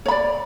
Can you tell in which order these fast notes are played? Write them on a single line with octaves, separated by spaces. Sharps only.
C#5 B5 D5